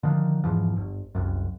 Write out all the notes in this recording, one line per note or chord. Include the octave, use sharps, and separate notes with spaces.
D3 D#3 F3
E2 G#2 E3 F3
G1
F#1 C2 F#2